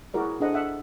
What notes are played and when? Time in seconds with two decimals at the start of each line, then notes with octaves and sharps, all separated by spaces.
0.14 E4 F#4 G#4 A#4 D5
0.40 D4 G#4 A4 C5 D#5 F#5
0.53 A4 E5 F#5